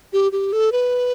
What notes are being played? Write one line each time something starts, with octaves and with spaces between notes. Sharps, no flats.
G4
G4
A4
B4